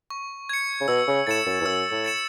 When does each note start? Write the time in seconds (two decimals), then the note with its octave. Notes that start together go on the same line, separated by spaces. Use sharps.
0.10 C#6
0.49 G#6 C#7
0.81 C#3
0.88 B2 E6
1.07 C#3
1.27 A2 A6 C#7 E7
1.46 F#2
1.60 E2
1.65 F#2 E6
1.91 A2
2.04 A6 C#7 E7